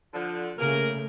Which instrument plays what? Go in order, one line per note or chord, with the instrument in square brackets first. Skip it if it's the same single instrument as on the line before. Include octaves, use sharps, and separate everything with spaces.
[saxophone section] D3 F3
[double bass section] C#3 A3 [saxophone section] A#3 G#4 A#4